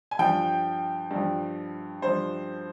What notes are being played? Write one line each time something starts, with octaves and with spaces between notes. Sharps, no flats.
G#5
G2 F3 G5
G2 F3
G2 F3 C5